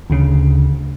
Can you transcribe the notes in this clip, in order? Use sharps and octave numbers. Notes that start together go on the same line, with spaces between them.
D2 C#3